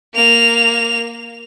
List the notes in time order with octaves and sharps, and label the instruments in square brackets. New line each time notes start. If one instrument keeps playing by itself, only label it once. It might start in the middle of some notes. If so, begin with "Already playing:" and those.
[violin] A#3 F7